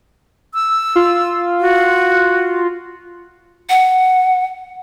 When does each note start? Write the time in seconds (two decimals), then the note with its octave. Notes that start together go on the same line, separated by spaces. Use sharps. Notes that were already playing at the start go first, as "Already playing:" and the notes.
0.54 E6
0.96 F4
1.60 F#4
3.70 F#5